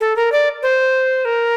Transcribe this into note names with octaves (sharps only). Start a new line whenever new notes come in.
A4
A#4
D5
C5
A#4